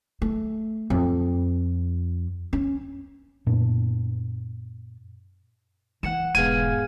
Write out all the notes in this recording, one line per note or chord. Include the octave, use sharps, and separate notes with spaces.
A3
F2
C#4
F#2 A#2 B3 D4
D#3 E3 F#5 C#7 E7
E1 G#2 B3 G#4 F5 G#5 D#7